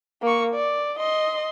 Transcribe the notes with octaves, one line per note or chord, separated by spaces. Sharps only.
A#3 C#6
D5
D#5 C6